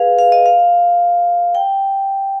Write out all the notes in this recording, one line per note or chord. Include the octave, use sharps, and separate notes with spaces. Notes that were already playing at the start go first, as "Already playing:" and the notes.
Already playing: G#4 B4 F5
F5
D#5
F5
G5